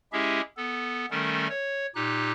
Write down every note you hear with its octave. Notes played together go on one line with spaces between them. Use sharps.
G#3 C#4 E4 G4 G#4 E5
B3 A4
D#3 G3 A3 C#4 A4 A#4
C#5
A#2 D#4 G4 F#6